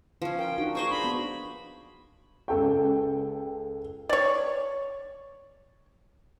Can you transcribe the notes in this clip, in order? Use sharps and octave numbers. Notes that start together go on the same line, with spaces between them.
F3 C#4
A#4 G5
D4 D#4 F#4
G#4 C5 D#5 C#6
D4 B5
B3 F#4
C#2 A4 G5
C#5 D5